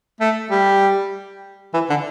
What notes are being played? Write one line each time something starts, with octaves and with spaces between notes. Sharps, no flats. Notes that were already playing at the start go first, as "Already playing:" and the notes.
A3
G3
E3
D3